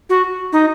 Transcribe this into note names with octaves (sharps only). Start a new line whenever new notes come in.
F#4
D#4